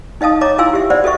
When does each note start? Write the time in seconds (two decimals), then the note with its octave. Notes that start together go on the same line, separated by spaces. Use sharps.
0.21 D#4 D#5 F5 A5 D#6
0.41 C#5 D#5 A#5 D6
0.58 E4 F4 F5 G#5 C6 E6
0.73 G4 E5
0.90 C5 D5 E5 F#5 B5
1.04 F#4 A4 D#5 E5 C#6